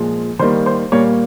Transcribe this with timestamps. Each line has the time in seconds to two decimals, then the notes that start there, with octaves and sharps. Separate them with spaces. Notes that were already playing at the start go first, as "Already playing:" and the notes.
Already playing: A#2 F3 G#3
0.39 D#3 G3 A#3 C5
0.66 C5
0.92 A#2 G3 A#3 C#5